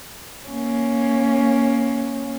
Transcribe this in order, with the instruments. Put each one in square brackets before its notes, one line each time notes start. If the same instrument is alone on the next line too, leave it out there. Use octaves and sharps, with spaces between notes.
[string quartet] A#3 C#4